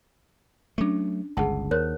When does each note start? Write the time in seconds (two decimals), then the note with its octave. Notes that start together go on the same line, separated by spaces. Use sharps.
0.78 F#3 A3 C#4 D4
1.37 G1 C#2 G#4 F#5 A5
1.71 D#2 A#4 C5 C#5